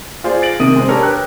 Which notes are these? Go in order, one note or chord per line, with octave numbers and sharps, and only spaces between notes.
F4 G#4 C5 D5
A6 D7 F#7
C3 D#3 D#6 D#7
G#3 C4
D4 G4 A4 A#4 C#5 D5
B4 G5 F#6